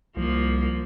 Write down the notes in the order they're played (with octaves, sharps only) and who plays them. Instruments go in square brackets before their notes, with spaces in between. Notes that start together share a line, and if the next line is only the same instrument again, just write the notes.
[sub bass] C2 [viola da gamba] F3 A#3